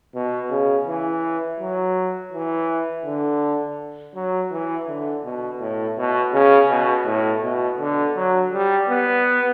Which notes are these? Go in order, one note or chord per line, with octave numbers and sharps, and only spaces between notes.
B2
C#3
E3
F#3
E3
D3
F#3
E3
D3
B2
A2
B2
C#3
B2
A2
B2
D3
F#3
G3
B3